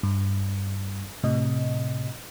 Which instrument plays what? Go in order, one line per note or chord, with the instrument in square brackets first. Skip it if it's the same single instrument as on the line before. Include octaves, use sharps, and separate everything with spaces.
[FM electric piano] G2
A2 C3 D#5